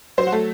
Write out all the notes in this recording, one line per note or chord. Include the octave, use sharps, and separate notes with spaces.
F#3 C5
F#4
A3 A4